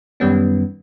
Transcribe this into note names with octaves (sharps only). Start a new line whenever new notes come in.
F#2 D#3 G3 B3 C#4